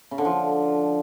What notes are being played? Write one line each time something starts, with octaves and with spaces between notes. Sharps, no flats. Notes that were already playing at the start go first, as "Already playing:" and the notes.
C#3
D3
F3